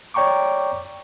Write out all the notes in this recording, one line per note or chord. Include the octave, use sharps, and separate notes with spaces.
C#5 D5 G5 A#5 C#6 D6